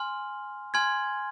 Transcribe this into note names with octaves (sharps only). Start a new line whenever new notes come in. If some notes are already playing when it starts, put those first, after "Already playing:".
Already playing: G#5 C6 F6
G#5 C6 F6 G#6